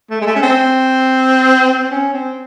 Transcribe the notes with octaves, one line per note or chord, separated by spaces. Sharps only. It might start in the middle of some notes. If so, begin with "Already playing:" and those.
A3
G#3
A3
C#4
C4
C4
C#4
C4